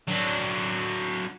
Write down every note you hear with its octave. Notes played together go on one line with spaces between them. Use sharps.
F#3 D4